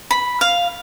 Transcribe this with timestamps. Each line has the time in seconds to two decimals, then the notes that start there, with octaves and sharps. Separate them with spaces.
0.11 B5
0.41 F5